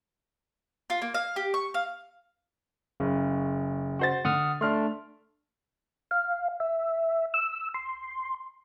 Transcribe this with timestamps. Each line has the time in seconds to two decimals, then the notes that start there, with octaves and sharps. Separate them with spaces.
0.90 F4
1.02 A#3
1.14 F5
1.36 G4
1.54 C#6
1.74 F5
3.00 F#1 C#3
3.99 F#4 C5 A6
4.25 D3 F#5 D#6 F6
4.61 A3 D4 C6 F6
6.11 F5
6.60 E5
7.34 E6
7.74 C6